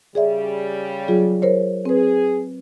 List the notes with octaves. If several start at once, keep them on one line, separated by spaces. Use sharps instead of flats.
C#3 G3 G#4 D5 E5
F#3 F4 G#4
A#4 C5 C#5
C4 G#4 B4